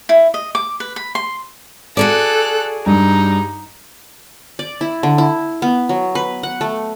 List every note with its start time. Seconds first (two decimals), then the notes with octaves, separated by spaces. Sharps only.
0.09 E4
0.34 D#5
0.55 D6
0.80 B4
0.96 B5
1.15 C6
1.97 F#4 G#4 A4 D5 F#6
2.86 G2 D#4
4.59 D5
4.81 E4
5.03 D3
5.18 E4
5.62 B3
5.89 F#3
6.15 B4
6.43 F#5
6.61 A3